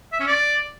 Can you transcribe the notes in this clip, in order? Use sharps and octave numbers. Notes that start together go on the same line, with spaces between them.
E5
C#4
D5